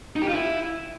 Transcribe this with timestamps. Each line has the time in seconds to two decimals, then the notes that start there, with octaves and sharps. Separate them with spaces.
0.16 D#4
0.22 G4
0.28 F4
0.34 E4